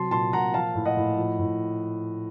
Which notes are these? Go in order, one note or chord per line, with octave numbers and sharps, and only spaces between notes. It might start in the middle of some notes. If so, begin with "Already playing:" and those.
Already playing: C3 F#3 A5 C6
A#2 A5 C6
A#2 F#5 A#5
F3 F5 A5
A2
D#5 F#5
A2
F3
A2